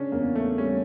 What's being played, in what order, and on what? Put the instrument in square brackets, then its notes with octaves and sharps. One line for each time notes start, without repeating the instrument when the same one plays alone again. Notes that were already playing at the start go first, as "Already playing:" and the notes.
Already playing: [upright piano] C#3 [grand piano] C#4 D4
[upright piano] E2 [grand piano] A#3
[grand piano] A3
[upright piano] G3 [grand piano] C#4